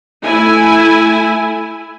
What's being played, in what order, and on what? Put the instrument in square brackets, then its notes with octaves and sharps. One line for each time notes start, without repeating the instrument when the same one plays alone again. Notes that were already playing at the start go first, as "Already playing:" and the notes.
[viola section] A3 E4 G#5